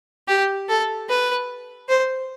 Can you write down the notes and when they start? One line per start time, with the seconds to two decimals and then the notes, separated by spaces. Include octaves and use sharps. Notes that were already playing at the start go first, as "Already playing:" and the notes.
0.28 G4
0.69 A4
1.09 B4
1.89 C5